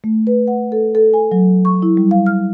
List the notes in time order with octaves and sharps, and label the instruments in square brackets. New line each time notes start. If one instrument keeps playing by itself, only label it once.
[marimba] A3
B4
F#5
A4
A4
G#5
F#3
C#6
E4
G3
F5
F6